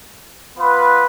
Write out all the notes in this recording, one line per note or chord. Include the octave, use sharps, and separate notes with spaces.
B3 F4 B4